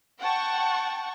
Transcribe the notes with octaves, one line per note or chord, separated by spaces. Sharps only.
F#5 G5 A5 C#6